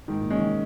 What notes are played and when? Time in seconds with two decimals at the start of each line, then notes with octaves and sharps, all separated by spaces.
0.08 G#2 D#3
0.20 A#2
0.30 C#3 G#3 C#4
0.41 D#3